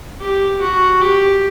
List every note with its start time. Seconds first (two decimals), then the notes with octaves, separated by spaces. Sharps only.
0.20 G4
0.61 F#4
1.01 G4